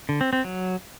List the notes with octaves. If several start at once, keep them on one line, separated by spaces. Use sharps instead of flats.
D3
C4
C4
F#3